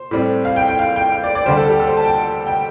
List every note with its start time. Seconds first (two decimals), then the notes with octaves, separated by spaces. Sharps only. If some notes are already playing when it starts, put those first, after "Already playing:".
Already playing: C5
0.11 A2 G3 C4
0.45 F5
0.56 G5
0.68 G5
0.79 F5
0.96 G5
1.12 F5
1.24 D5
1.35 D5
1.46 D2 D3 G3 C5
1.57 A4
1.69 G4
1.80 A4
1.87 C5
1.97 A5
2.04 G5
2.47 G5